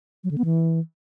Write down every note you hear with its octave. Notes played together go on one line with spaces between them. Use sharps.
F#3
D3
B3
E3